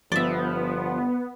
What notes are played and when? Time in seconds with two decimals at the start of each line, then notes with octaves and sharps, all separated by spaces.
0.12 G1 F3 B3 D5 E5